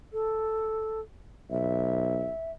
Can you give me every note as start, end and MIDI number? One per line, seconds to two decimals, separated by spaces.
0.13 1.00 69
1.51 2.30 35
1.51 2.52 76